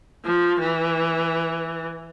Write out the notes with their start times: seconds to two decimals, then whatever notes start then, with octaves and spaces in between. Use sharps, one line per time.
0.24 F3
0.59 E3